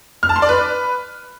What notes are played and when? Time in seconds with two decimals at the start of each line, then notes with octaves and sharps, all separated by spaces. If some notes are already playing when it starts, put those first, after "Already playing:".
0.23 F6
0.29 A5
0.36 C6
0.42 D5
0.49 B4